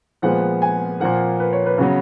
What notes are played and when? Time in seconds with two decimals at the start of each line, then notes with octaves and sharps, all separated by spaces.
0.22 A#2 F3 G#3 B3 F#5
0.62 G#5
1.00 A#2 F3 A#3 F#5
1.40 B4
1.53 C#5
1.66 B4
1.78 C#3 F#3 B3